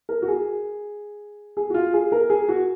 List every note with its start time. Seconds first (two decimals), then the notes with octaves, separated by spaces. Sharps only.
0.09 A#4
0.22 F#4
0.28 G#4
1.57 G#4
1.70 F#4
1.74 F4
1.93 G#4
2.12 A#4
2.30 G#4
2.49 F#4